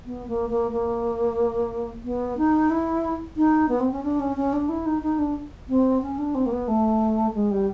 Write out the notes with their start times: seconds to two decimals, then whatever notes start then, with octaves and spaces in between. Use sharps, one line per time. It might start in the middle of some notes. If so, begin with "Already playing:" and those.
0.06 B3
0.27 A#3
0.49 A#3
0.71 A#3
2.04 B3
2.38 D#4
2.70 E4
3.37 D#4
3.69 B3
3.80 C4
3.92 C#4
4.03 D4
4.20 C#4
4.37 C#4
4.53 D4
4.69 E4
4.86 D#4
5.02 D#4
5.19 D4
5.69 C4
6.02 C#4
6.18 D4
6.35 C4
6.46 A#3
6.52 B3
6.68 A3
7.34 G#3
7.51 G3